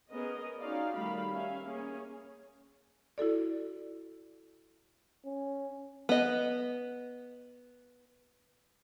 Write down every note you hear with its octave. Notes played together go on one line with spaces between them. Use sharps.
B3 C#4 G#4 A#4 D#5
C#4 D#4 F4 F#4 D5 F5
D#3 G3 A3 F5 B5
C#4 E5 F5
A#3 C#4 G#4
E4 F#4 A4 D5
C#4
B3 D#5